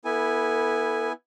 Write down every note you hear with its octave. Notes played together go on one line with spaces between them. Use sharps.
B3 E4 A4 G#5